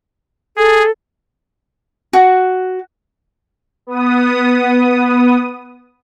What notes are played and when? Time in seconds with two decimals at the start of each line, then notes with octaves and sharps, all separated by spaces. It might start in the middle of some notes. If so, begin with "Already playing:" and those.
0.57 G#4 A4
2.13 F#4
3.87 B3 D#6